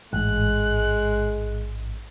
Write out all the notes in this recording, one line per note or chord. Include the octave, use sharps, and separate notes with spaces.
A1 G#2 G#3 F#6